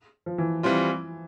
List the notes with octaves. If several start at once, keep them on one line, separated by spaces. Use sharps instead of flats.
F3
E3
E3 G3 C4 F4